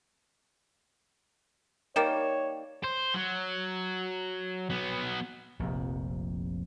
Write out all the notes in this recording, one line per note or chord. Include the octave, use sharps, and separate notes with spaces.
D#3 G3 A#3 C#5 G5 E7
C5
F#3
F#3 B3
F1 A#1 F2 C3